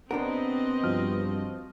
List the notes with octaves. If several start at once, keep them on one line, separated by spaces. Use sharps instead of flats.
C3 B3 C4 D4 A#4 D#5 F#5
G2 F3 F#4 F6